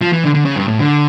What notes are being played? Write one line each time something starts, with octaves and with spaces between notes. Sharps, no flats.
F3
E3
D3
D3
C#3
G2
A2
D3